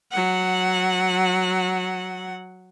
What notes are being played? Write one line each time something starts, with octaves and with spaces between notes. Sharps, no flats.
F#3 F#5